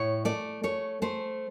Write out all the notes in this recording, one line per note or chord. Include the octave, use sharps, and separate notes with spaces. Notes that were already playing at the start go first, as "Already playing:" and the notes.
Already playing: A2 C#5
A3 D5
A3 C#5
A3 C5